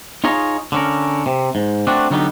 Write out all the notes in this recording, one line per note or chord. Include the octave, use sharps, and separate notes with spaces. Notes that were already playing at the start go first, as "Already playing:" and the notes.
D#4 F4 G#4 C#5 A#5
D3 C#4 A#4
C3
G#2
A3 C4 D4 F#4
D3 F#3 G3 B3 D#4